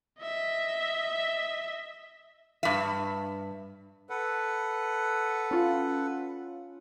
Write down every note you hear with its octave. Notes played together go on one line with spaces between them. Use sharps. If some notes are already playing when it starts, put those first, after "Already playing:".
D#5 E5
G2 E5
A4 B4 F#5
C#4 F4